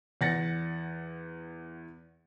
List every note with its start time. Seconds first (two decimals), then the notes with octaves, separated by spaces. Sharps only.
0.21 E2 F#5 A6 A#6 C#7